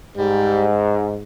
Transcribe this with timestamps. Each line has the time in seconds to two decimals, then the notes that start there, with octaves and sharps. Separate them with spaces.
0.17 G#2 G3